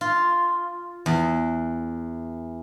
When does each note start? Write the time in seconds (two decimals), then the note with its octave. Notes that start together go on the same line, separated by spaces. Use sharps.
0.01 F4
1.06 E2